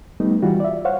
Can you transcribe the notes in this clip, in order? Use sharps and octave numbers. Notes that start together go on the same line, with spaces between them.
G3 A3 B3 D#4
E3 G3 F4 F#4
D5 E5
C5 C#5 F5 F#5